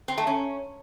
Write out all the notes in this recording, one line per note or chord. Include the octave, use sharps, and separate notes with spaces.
C4
A3
C#4